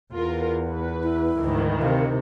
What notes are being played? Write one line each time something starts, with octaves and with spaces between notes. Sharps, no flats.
E2 F4 A#4
B4
E4
D2 G#2 D#3 E3
C3 F5